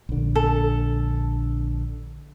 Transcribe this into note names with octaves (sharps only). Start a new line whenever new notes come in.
A#1 D3
A4